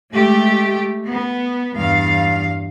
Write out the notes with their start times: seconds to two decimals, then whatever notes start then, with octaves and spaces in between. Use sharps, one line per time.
0.13 G#3 A3 G4
1.09 B3
1.77 E2 G2 F5